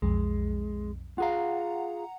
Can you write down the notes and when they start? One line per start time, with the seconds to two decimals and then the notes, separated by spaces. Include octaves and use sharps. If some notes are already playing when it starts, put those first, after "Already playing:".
0.02 B1 F2 G#3
1.18 F4 G#4 F5 F#5 A#5